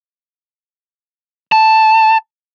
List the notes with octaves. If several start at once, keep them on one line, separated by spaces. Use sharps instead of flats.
A5